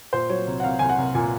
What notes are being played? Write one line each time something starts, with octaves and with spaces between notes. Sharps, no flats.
A#2 C5
F#3 C#5
C2
F#5
C2 F5
C2 G#5
F#5
C2
A#2 G#5